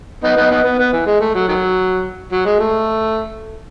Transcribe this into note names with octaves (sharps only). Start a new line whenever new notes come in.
B3 D#4
B3 D#4
B3 D#4
B3
B3
E3
G#3
A3
F#3
D#3 F#3
F#3
G#3
A3